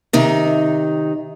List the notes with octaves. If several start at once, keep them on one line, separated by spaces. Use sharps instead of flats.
C3 D#3 D#4